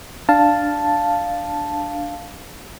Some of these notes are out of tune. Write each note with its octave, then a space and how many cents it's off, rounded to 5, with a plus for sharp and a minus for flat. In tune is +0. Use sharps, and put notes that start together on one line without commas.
D4 +5 F5 +0 A5 +0